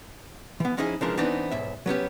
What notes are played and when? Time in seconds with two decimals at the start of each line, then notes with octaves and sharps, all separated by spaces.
0.60 E3 B3
0.77 F3 C#4 D#4 E4 G#4 D#5
1.01 C#3 E3 F3 G#3 D4 A#4
1.17 E3 B3 C4 D4 D#4
1.51 B1 G#2 E5
1.86 F#3 B3 C#4 G4